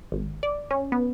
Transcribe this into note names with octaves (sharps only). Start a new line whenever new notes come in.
G#1
D5
C#4
B3